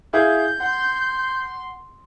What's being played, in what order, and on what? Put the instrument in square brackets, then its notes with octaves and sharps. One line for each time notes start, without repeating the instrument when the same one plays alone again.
[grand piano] E4 G#4 F5 [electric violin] G6
[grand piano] F#5 [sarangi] C6